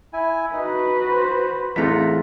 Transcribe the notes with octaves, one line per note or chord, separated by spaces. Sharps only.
E4 G#5
D#4 F#4 B4
C5
E2 A3 C4 E4 F4 A#5 B6